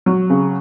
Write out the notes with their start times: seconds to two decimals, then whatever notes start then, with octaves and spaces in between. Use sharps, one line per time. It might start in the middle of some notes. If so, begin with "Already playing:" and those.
0.06 F#3
0.30 C#3